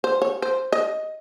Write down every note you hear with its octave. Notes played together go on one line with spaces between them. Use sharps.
C5
C#5
C5
D#5